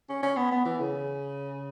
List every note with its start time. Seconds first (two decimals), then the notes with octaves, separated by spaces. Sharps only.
0.09 C#4
0.23 C#4
0.37 B3
0.52 B3
0.65 E3
0.80 C#3